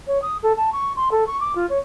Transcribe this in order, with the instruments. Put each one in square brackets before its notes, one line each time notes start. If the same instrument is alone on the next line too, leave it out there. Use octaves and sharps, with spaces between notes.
[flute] C#5
D#6
A4
A5
C#6
C6
A4
C#6
D6
F4
C#5